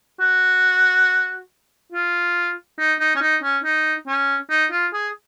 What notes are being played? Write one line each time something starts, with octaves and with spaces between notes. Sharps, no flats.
F#4
F4
D#4
D#4
C#4
D#4
C#4
D#4
C#4
D#4
F4
G#4